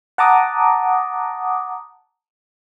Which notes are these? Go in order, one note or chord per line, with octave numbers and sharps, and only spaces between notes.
F#5 A5 A#5 D6 D#6